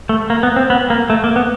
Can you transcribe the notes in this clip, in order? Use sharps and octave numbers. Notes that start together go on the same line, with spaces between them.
A3
A#3
B3
C4
B3
A#3
A3
A#3
B3